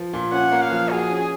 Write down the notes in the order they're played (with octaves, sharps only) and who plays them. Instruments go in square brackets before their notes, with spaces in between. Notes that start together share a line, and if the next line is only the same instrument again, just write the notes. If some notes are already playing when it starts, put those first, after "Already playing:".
Already playing: [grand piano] F3
A#2
[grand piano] C#4 [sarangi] F#5
[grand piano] A#3
[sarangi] F5
[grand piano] F3
[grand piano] F#4 [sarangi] G#4
[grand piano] C#4